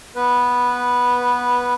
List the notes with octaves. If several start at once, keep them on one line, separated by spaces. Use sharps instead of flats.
B3 B4